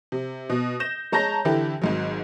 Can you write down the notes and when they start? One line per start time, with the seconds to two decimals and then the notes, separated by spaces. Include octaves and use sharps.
0.12 C3
0.50 B2
0.80 G6 A#6 E7
1.12 G#3 C#5 A5 A#5 G6 A#6
1.45 D3 E3 E4 G4 A4
1.82 G#1 G#2 F#3